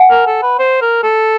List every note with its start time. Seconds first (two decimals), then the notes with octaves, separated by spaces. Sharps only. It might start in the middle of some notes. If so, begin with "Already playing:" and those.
Already playing: F#5 G#5
0.10 A#4
0.27 A4
0.42 B4
0.59 C5
0.82 A#4
1.03 A4